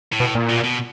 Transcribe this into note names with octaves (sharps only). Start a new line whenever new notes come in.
A2
B2
A#2
B2
B2